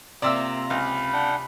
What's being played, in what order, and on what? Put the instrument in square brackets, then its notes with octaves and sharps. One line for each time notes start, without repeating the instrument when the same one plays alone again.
[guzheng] C3 C4 [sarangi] A#3 [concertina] F4 A#5 [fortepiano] D5 E5 E6
[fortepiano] C#2 F5 [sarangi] B5
[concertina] D4 F#5 G5